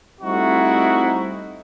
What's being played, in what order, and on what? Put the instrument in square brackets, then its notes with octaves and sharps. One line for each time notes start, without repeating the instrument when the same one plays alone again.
[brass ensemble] G3 A3 C4 D#4 E4 F#4